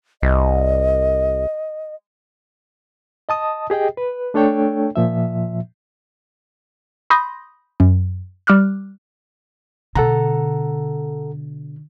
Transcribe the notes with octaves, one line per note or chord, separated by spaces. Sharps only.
C2 D#5
D#5 A5 D#6
G4 G#4 D#5 G5
B4
A3 D4 A4 C#5 G5
A#2 F3 E5
B5 C6 D#6 G6 A#6
F#2
G3 D6 F6 F#6
B2 D3 A4 F#5 A#5